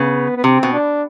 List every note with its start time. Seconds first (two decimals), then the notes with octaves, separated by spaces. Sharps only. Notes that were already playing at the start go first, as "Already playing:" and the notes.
Already playing: C#3 B3
0.36 B3
0.44 C3 C4
0.63 B2
0.73 D4